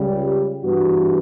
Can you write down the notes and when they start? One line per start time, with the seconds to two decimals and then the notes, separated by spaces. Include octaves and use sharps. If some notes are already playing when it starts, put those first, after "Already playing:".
Already playing: C#2 C#3 G3
0.64 G2 E3 B3 F#4